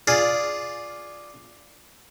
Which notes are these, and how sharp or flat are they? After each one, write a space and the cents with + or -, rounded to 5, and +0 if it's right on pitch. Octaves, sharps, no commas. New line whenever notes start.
F4 +0 G#4 +0 D5 +0